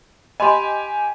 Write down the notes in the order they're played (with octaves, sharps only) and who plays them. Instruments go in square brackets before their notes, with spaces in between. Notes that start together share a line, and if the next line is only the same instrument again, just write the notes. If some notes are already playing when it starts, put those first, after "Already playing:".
[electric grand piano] G4 G#5 [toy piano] D#5 B5 C6